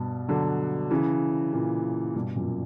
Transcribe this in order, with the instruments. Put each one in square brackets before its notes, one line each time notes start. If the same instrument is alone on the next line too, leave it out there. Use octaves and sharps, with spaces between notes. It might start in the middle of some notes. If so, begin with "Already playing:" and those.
Already playing: [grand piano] G2 B2
D3 F#3
C#3 E3
A#2 C#3
G2 B2
F#2 A#2